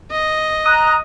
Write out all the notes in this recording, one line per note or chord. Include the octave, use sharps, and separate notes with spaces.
D#5
A#5 D#6 F#6